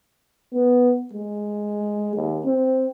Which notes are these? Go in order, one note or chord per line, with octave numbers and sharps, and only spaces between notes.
B3
G#3
D#2
C4